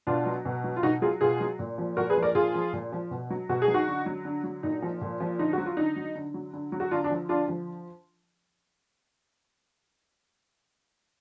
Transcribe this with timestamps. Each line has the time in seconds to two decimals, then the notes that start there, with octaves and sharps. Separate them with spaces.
0.07 B2 D4 F4
0.26 F#3
0.45 B2
0.64 F#3
0.76 F4
0.83 B2 D#4 F#4
1.02 F#3 F4 G#4
1.21 B2 F4 G#4
1.41 F#3
1.59 A#2
1.78 F3
1.97 A#2 F#4 A#4
2.10 G#4 B4
2.16 F3
2.23 A#4 D5
2.35 A#2 F4 G#4
2.54 F3
2.73 A#2
2.92 F3
3.11 B2
3.30 F#3
3.49 B2 F#4
3.62 G#4
3.68 F#3
3.74 D#4 F#4
3.87 D3
4.06 F#3
4.25 D3
4.44 F#3
4.63 A#2 D#4
4.82 F3
5.01 A#2
5.20 F3
5.39 D3 D#4
5.53 F#3 F#4
5.65 F4
5.77 D3 D#4
5.96 F#3
6.15 D3
6.34 F#3
6.53 D3
6.72 F#3
6.80 F#4
6.91 D3 D4 F4
7.04 D4
7.10 F3
7.29 D3 D4 F4
7.48 F3